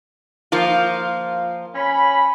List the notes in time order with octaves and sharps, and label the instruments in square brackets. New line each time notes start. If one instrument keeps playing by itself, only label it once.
[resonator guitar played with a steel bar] F3 A#3 F4
[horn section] C#4 B5